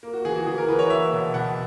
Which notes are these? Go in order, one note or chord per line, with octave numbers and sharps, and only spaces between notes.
A#3
F#4
E3 G#4
F#4
E3 G#4
A#4
E3 B4
C#5
A#3 E5
B2
B2 F#5